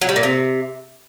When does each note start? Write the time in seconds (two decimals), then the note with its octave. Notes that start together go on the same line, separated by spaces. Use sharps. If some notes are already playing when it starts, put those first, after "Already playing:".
0.01 F#3
0.09 G3
0.16 A#2
0.23 C3